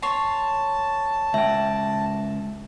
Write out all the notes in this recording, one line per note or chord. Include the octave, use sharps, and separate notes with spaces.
C#5 A5 C6
C#2 E5 G5